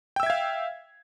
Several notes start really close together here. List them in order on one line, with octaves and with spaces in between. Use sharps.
G5 E6 E5 G#6 F5